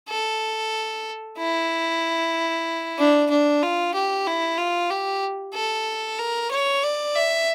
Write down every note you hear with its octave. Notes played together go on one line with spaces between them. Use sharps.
A4
E4
D4
D4
F4
G4
E4
F4
G4
A4
A#4
C#5
D5
E5